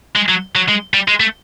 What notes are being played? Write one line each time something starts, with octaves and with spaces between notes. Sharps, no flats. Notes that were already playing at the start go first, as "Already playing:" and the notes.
G#3
F#3
F#3
G#3
G3
G#3
A3